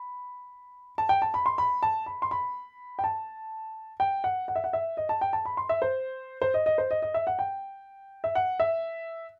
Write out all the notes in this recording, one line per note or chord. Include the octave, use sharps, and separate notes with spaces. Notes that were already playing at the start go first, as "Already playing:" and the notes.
Already playing: B5
A5
G5
A5
B5
C6
B5
A5
B5
C6
B5
G5
A5
G5
F#5
F#5
E5
F#5
E5
D#5
A5
G5
A5
B5
C6
E5
C5
C5
D#5
D#5
C5
D#5
D#5
E5
F#5
G5
E5
F#5
E5